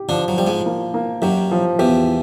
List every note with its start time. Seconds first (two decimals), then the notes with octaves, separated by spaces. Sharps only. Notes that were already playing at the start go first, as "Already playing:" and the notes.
Already playing: G4
0.09 D3 F3 D4
0.28 F#3
0.37 F3 G3
0.47 G#2 G#3
0.66 A#3
0.94 A#3
1.22 F#2 F#3 G4
1.51 F3
1.79 E2 E3 G4